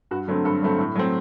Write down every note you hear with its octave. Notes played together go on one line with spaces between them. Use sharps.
G2 F#4
D3 F#3 A3 C4
G2 A4
D3 F#3 A3 C4
A2
F#3 A3 C4